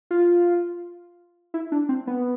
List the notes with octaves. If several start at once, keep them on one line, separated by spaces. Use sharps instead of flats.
F4
E4
D4
C4
B3